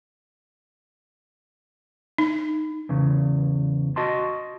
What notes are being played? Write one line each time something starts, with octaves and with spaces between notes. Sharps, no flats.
D#4
E2 C#3
F#4 D#5 A5 C6